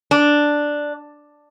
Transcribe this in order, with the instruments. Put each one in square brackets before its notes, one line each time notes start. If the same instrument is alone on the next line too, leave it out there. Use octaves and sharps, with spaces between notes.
[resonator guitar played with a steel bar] D4